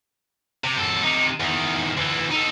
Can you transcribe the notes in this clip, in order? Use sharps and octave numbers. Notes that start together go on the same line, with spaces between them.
C3
F#2 A4
C3 D#4
E2 D#3
D2 E3
D#4 A4